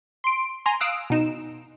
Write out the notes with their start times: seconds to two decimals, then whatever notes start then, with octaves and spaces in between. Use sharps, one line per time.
0.24 C6 D7
0.66 G#5 A#5 C6
0.80 F5 D#6 E6 F#6 D7
1.10 B2 D#4 E7